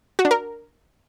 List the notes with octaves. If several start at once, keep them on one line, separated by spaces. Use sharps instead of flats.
F#4
D4
A#4